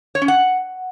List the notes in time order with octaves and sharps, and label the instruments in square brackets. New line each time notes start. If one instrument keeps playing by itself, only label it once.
[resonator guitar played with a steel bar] C#5
C#4
F#5